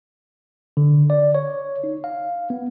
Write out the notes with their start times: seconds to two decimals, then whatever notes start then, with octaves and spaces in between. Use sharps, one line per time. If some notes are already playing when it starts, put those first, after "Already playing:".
0.77 D3
1.10 D5
1.35 C#5
1.84 D#4
2.04 F5
2.50 B3